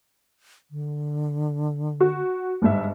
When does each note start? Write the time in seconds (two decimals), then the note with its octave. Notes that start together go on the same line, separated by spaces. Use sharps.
0.71 D3
2.00 F#4
2.62 G1 G#2 E5